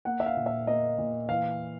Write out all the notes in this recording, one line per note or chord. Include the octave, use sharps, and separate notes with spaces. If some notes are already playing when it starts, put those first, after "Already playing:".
A#3 F#5
E5
F5
A#2
E5
A#3 D#5
A#2
E3 F5